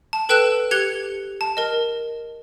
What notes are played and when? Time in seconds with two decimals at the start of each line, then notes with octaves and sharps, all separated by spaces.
0.13 A5
0.29 A4 B4 G5 E6 F#6 E7
0.71 G4 F#6 G#6 C#7 F7 G7
1.41 A5
1.57 A#4 D#5